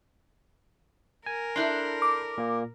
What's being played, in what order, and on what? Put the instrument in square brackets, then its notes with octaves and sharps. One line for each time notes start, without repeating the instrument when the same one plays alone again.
[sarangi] A#4 [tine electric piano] G#5
[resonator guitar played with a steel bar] D4 E4 A4 [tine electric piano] C6 G6 C7
[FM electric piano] D6
[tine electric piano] A#2 A#3